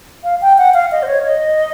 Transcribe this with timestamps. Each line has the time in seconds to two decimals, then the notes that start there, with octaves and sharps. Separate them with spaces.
0.24 F5
0.42 G5
0.58 F#5
0.74 F5
0.92 D#5
1.03 C5
1.07 C#5
1.25 D#5